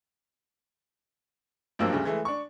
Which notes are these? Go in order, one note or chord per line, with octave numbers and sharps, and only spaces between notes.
G#1 G2 F3 F#3 A#3 E6
D2 C#3 G3
E3 G#3 A3
D4 C#6